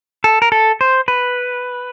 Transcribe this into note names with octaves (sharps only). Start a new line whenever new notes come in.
A4
A#4
A4
C5
B4